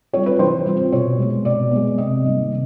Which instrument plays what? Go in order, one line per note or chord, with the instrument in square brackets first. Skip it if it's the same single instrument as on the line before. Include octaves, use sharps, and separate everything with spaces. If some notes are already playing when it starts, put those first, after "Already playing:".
[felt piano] G3 C4 F4 C#5
B4
E3 C5
G3 C4 F4
B2 C#5
G#3 B3
B2 D5
G#3 B3
C3 D#5
D#3 G3 A#3
C3